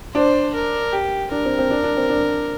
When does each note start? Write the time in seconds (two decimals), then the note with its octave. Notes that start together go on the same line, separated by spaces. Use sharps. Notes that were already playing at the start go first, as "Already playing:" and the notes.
0.14 D4 C5
0.54 A#4
0.92 G4
1.31 D4 A#4
1.45 C4
1.58 C4
1.70 D4
1.84 D4
1.97 C4
2.09 D4